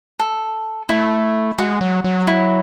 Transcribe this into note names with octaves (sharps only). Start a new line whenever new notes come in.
A4
A3 E4
G#3 F#4
F#3
F#3
E4